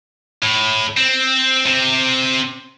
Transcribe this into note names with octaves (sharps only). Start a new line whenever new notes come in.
A2
C4
C3 C4